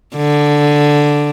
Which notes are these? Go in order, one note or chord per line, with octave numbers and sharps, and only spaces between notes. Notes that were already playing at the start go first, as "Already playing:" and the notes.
D3